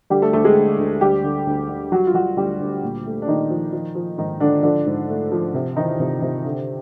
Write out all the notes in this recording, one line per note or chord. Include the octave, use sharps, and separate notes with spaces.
D3 G3 G4
A3 A4
D2 A3 A4
G#3 G#4
D2
D2
D2 G3 G4
D3
D2
D3
F#3 G3 F#4
F4
F#3 G3 F#4
D2 G3 G4
D2
A#2
A3
D4
A#2 D#3 D#4
F3
F3
F3
G#2 D#3 D#4
G#2 D3 D4
D3 F3 D4
G#2
A3
F3
C3
D#3 E3 D#4
C3
C3
D3